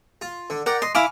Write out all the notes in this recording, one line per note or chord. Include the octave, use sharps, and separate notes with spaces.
F4
D3
A#4 D5 F#5 G5
D#5 C6
E4 F5 G#5 B5 C#6 D6